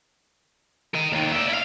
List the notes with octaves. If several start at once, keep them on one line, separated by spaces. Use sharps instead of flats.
A#4 D#5
D#2 D#3
D5 E5
E4 F5